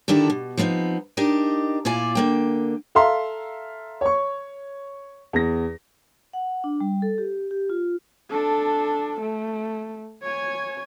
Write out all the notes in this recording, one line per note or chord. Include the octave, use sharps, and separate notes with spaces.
D3 D#3 D4 E4 G4 A4
B2
F3 B3 C4 D4 D#4
D4 D#4 G4 A#4 D#5
A#2 E4 F4 D5 G#5
D3 A#3 G5
A4 E5 F5 A#5 C6
C#5 C#6
E2 A#6
F#5
D4
G3
A4
G4
G4
F4
D4 A4
A3
C#5 G#5